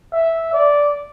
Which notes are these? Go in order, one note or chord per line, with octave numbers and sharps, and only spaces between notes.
E5
D5